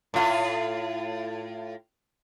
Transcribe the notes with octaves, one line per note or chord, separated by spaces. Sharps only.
A2 F4